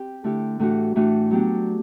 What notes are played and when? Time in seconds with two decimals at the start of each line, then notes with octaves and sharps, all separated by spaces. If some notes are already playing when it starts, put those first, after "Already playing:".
Already playing: C4 G4
0.24 D3 A3 E4 G4
0.60 A2 E3 A3 D4 F#4
0.96 A2 E3 A3 D4 F#4
1.31 F#3 B3 D4 G4